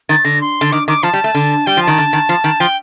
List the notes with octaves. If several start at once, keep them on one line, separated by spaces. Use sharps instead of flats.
D#3 A6
D3 A#6
C6
D3
D#3 D6
D#3 D6
F3 A5
G3
A3
D3
G3 G5
F3
A5
D#3
D3
D#3
F3
D#3
F3 G5